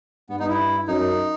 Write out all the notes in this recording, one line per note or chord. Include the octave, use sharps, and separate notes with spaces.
G2 B3
D#4
E4
F#2 D#4